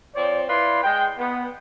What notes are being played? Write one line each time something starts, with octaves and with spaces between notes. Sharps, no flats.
F3 C4 C#5 D5
E4 B4 D5 F5 C6
G#3 G5
B3